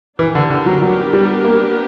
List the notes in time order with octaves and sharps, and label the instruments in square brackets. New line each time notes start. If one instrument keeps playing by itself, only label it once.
[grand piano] E3 [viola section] B3 D4 G4 A#4
[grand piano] D3
D3
F#3
F#3
G3
A#3